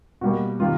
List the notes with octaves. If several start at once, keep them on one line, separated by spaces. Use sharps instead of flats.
B2 G3 A#3 F#4
C3 D#3 G3 A#3 F4